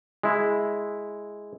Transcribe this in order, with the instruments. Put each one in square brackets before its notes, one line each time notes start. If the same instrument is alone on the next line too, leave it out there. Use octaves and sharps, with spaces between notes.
[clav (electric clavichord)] G#3 E4